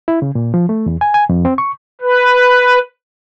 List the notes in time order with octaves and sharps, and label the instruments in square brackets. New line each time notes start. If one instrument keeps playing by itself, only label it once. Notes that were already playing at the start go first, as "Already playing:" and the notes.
[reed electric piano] E4
C#3
A#2
F3
A3
E2
G#5
G#5
F2
C4
C#6
[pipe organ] B4